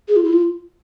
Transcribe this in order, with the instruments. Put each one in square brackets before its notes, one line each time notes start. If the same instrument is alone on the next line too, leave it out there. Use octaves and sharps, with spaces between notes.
[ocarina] G#4
F4
E4
F4